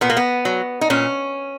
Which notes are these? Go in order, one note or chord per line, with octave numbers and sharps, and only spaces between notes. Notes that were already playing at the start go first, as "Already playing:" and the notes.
A#2 B3
A#3
B3
F#3
D#4
A#2 C#4